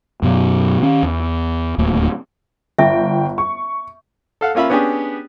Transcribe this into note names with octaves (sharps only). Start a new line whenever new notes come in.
F#2 B2 F#3
D#3 C#4
E2
D1 D#2 A3 A#3
G1 E5 G5
C#6
A4 F5 F#5
A#3 C#4 F4 E5 B5
B3 C#4 D4 G4 G#4